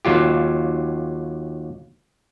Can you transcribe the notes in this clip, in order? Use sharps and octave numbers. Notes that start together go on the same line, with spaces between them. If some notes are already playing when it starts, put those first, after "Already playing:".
D#2 F#3 F4 G4